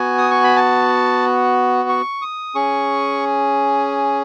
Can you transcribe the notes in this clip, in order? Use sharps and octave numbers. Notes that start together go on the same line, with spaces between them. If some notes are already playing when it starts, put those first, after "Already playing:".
Already playing: B3 F#4 G#5
D#6
C#6
B5
A5
C#6
D#6
C#4 G#4 C#6